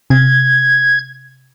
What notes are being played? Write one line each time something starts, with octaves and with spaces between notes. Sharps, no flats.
C3 G#6